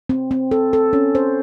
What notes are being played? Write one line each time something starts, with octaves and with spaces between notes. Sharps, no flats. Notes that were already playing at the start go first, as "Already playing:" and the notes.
C4
C4
A4
A4
C#4
C5